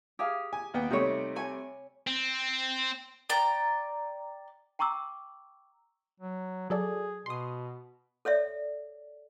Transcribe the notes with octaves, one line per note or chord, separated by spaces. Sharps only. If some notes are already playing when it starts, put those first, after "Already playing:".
G4 G#4 F5
G#5
D#2 B3 G5
C3 G3 A3 D#4 C#5
C#5 G#5
C4
D5 G5 A#5
G5 A#5 C#6 D6 E6
F#3
F#3 G#4 A4 D5
B2 C6 D#6
A4 C#5 D5 E5